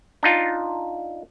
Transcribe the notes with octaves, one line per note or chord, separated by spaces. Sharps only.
D4 D#4 F4